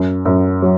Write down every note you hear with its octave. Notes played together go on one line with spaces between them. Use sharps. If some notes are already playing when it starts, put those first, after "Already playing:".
Already playing: F#2
F#2
F#3